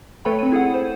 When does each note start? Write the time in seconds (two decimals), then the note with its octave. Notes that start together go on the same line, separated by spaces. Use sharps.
0.25 A3 A4 B4 C#5 G5 B5
0.39 C4 D#7
0.52 E4 G#4 A4 F#5
0.74 C5